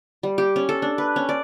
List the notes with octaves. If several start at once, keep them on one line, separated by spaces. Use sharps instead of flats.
G3
G4
C#4
A4
D4
B4
C#4
D5